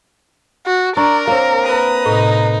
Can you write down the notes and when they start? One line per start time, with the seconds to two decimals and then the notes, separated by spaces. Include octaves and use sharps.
0.66 F#4
0.97 D4 A#4 D5 A#5 C#6
1.27 A#3 C4 C#5 A#5
1.63 B4 A#5 D#6
2.06 A2 C3 D#4